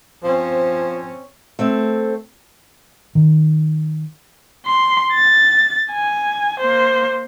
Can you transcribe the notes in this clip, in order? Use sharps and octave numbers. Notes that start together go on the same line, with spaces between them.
F3 C4 C#4
A3 C4
D#3
C6
A6
G#5
A#3 C5